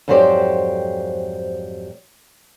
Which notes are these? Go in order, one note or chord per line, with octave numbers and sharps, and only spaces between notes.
F2 G#2 F#3 G4 C5 D5